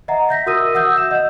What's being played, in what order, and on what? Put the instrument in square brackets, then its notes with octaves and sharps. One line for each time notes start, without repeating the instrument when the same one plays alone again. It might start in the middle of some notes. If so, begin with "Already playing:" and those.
[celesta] D#5 E5 F#5 A#5
E5 G6 A#6 B6
F#4 A#4 D#6 E6 A#6 D#7
E5 F#5 D#6 E6 G6
F#5 G6 E7
D#5 F#5